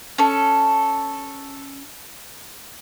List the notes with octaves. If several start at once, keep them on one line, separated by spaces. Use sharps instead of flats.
C#4 A4